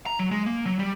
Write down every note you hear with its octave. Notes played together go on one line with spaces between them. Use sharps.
A#5
F#3
G#3
A#3
F#3
G3